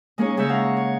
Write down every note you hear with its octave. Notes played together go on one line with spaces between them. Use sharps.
G#3 A#3 C#4 D#4 G#4 C#5
C#3 G#3 C#5 E5 G6
F5 F#5 A#5
C#5